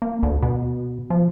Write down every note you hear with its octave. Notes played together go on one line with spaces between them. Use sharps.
A#3
D2
B2
F3